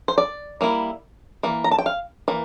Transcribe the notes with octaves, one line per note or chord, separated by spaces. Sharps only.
C5
D5
G3 A#3 E4
E3 A#3
A#5
A5
G5
F5
E3 A#3